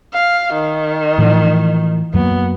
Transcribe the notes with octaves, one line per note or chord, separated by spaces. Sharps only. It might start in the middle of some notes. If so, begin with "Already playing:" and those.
F5
D#3
A2 E3 F3
F#2 F#3 A#3 B3